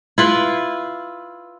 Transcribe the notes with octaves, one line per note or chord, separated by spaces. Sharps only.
E4 F4 B4